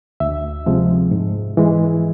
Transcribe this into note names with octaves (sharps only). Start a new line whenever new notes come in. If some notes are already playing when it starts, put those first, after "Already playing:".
D2 E5
C3 F3 G#3
G#2
E3 G#3